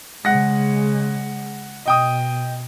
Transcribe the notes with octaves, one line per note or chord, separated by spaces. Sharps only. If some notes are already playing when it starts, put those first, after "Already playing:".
C#3 G#3 F#5 A#6
B2 D#5 G5 D#6